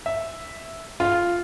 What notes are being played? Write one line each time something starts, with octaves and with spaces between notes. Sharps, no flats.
E5
F4